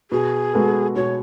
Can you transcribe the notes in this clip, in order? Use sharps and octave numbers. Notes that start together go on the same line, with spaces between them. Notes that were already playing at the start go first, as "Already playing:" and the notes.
B2 G#4
G#3 B3 F#4 A4
B2 C#5